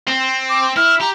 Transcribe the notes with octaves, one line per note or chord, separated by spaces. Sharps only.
C4
D6
E4 F6
G4 A#5